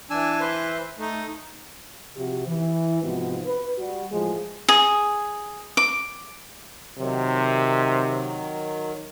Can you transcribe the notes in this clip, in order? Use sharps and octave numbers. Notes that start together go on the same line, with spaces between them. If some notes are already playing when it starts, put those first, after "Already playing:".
E3 D4 G#5 E6
B4 C5
A3 D#4
C3 F3 F#4 G4
E3
G#2 C3 F3 B3 D#4 F#4
B4
G3 F#4
A2 E3 F3 G#3
G#4
D6
C3 D#3 F#3